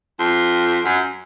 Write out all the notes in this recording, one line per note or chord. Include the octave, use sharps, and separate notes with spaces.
F2
F#2